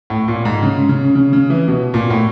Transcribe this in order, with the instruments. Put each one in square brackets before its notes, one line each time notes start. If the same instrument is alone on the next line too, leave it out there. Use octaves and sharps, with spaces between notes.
[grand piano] A2
A#2
G#2
C#3
C#3
C#3
C#3
E3
B2
A#2
A2